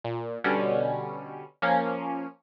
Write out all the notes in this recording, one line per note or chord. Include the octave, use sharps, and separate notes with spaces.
A#2
B2 D3 G3 C#4
F3 A#3 C#4